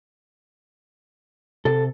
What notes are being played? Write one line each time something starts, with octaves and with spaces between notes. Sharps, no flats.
C3 A4